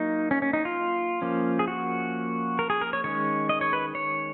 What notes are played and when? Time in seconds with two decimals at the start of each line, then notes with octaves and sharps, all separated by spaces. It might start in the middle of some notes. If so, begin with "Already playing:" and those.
Already playing: F#3 A#3 D#4
0.31 C#4
0.42 C#4
0.53 D#4
0.65 F4
1.22 F3 A#3 C#4
1.59 G#4
1.68 F#4
2.59 A#4
2.70 G#4
2.82 A#4
2.93 C#5
3.04 D#3 G#3 C#4 C#5
3.49 D#5
3.61 C#5
3.73 B4
3.95 C#5